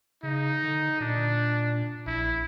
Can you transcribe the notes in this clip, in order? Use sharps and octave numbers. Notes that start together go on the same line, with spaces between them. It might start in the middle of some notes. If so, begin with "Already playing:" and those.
C#3 D#4
D3
A#2 D4
A#1 E4